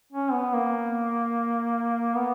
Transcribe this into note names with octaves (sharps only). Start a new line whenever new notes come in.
C#4
B3
A#3
B3